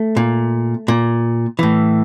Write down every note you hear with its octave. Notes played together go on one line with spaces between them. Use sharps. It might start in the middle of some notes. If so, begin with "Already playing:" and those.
Already playing: A3
A#2
A#2
A2 E3